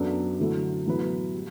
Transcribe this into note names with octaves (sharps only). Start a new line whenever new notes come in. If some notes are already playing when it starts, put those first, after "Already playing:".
Already playing: F#2 F#3 B3 D4 A4
D3 F#3 A3 E4
A2 F#3 B3 E4 B4
G3